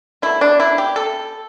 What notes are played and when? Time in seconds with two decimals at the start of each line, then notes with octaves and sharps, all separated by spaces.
0.22 B2 A3 E4
0.41 D4
0.60 E4
0.78 G4
0.96 A4